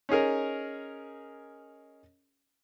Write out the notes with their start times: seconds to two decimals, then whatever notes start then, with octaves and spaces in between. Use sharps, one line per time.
0.09 C#4 D#4 G#4 A#4